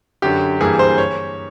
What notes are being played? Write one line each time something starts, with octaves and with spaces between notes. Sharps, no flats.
F#2 D3 F#3 G4
G2 E3 G3 A#3 G#4
C5
C#5